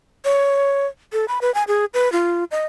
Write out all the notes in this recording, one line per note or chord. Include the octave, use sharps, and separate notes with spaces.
C#5
A4
B5
B4
G#5
G#4
B4
F4
D#5